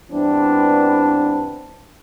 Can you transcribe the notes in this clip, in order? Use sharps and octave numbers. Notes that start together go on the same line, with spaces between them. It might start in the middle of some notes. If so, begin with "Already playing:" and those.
G2 E3 B3 C4 D4